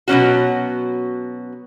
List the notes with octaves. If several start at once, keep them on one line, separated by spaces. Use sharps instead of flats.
B2 F#3 A#3 C#4 F#4